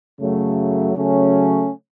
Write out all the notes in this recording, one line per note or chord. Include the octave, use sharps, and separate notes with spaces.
F#2 C#3 F#3 A3
C#3 F#3 A3 C#4